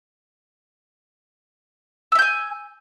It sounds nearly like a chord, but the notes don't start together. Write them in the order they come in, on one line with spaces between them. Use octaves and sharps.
E6 E5 G6 G#5